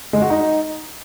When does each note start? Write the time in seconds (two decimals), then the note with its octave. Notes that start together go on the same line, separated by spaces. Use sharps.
0.13 G#3
0.22 F#4
0.30 D#4